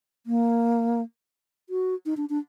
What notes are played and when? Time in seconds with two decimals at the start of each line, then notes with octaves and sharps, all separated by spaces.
0.26 A#3
1.70 F#4
2.06 D#4
2.17 D4
2.30 D4